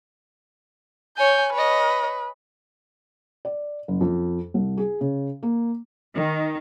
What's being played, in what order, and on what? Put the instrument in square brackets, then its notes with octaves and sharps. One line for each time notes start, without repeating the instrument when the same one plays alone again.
[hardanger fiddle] C#5 G#5 [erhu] G6
[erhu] B4 [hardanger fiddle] C#5 D#5
[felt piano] D5
F#1
F2
C2
G#4
C#3
A#3
[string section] D#3